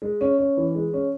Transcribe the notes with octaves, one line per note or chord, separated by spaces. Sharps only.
G#3
C#4
C#4
E3
G#3
C#4